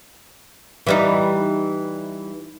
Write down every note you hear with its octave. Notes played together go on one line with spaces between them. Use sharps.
E3 G3 D#4